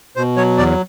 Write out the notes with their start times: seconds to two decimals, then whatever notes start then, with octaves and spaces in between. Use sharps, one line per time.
0.16 B2 C5
0.37 F#3 C#5
0.58 E2 D5